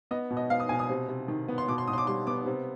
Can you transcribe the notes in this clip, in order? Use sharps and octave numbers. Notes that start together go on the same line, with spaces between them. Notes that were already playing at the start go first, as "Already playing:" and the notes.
B3 D#5
B2
D#5
B3 F5
D#6
B2 G#5
D#6
C3
C3
D#3
B3
C6
B2 D6
C6
B2 D#6
C6
D6
G3 C6
B3 D6
C3